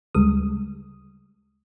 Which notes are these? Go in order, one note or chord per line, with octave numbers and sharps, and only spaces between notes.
D2 C#3 G3 G#3 D#6